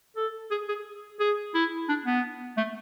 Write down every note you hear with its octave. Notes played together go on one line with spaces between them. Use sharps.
A4
G#4
G#4
G#4
E4
D4
B3
A3